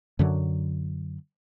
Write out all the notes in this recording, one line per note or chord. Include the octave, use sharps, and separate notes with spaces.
F#2 D3 F#3